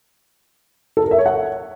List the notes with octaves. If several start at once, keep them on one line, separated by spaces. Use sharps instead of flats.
A4
A#4
E5
C#5
F#5